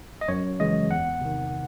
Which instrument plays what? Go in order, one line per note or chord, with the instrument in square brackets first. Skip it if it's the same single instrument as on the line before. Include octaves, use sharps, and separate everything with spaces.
[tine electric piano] D#5
F#2 C#5
C#3 E3 G#3 D#5
E2 F#5
C3 D#3